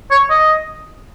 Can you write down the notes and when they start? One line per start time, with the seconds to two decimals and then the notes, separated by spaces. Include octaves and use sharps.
0.11 C#5
0.30 D#5